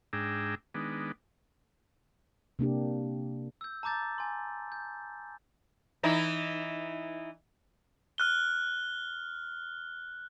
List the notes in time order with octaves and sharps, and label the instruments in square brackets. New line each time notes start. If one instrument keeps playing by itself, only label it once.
[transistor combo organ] G#2 D4 G#4 G5 A#5 E6
D#3 G#3 B3 D4
[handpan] C3 A#3 D4 G4
[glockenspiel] E6 G6
A5 A#5 D6 G6 A6
G#5 C6
G6
[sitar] E3 D#4 E4
[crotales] F6 F#6 G7